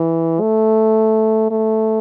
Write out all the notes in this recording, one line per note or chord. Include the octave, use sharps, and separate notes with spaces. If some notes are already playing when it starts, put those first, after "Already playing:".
Already playing: E3
A3
A3